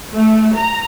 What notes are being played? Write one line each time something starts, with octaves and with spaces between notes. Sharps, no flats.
A3
A#5